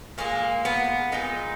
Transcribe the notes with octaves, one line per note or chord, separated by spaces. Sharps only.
A#2 G#3 A#3
B3
A#2 G#3 D#4